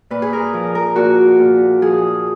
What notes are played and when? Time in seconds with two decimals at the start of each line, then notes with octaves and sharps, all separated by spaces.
0.10 A#2 B4
0.22 G#4
0.33 A#4
0.54 F3
0.75 A#4
0.96 A#2 F#4
1.39 A#2
1.82 F3 G#4